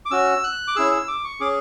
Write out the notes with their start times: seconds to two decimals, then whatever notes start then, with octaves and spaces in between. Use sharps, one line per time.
0.05 D6
0.11 C#4 F#4 E6
0.44 F#6
0.68 D6
0.76 C#4 E4 G#4 E6
0.92 E6
1.08 D6
1.24 C#6
1.40 C#4 G#4 D6